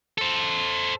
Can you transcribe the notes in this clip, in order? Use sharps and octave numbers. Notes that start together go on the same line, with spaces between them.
A4 C5